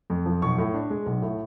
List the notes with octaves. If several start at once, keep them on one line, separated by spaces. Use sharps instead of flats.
F2
F3
B1 C#6
A2
D4
G#3
B1
A2